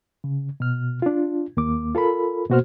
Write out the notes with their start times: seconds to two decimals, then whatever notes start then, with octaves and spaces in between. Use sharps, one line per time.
0.24 C#3
0.60 B2 F6
1.02 D4 F4
1.57 D#2 A#3 D6
1.95 F4 A4 A#4 B5
2.49 B2 A#3 F#4 C5 F6